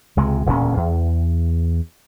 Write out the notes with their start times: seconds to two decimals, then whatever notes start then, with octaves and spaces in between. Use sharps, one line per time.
0.17 C#2 C3 G#3
0.46 E1 D2 A#2 C#4
0.77 E2